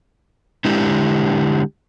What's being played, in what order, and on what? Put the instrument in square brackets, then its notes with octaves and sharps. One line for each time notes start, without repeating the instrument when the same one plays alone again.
[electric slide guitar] D3 G#3 E4 G4